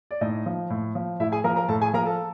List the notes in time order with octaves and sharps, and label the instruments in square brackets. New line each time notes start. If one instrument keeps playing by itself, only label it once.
[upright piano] D5
A2 D#4 D#5
F3
A2
F3
A2 E4 E5
G#4 G#5
F3 A#4 A#5
A#4 A#5
A2 A4 A5
G#4 G#5
F3 A#4 A#5
A4 A5